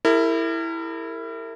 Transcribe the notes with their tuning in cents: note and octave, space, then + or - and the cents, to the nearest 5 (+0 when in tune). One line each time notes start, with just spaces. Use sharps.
E4 +0 G4 +45 A#4 -35